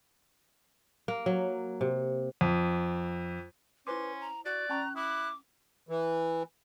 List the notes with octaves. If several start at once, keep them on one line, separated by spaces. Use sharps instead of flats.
A#3
F#3
C3
F2
C#4 E4 B4 C5 C6 D6
A#5
F#4 D5 F#6
C#4 A5 A#5 C#6
E4 D6 D#6 F#6
E3